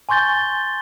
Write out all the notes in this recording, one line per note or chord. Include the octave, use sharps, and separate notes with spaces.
G#5 C6 C#6 G6 A6 G7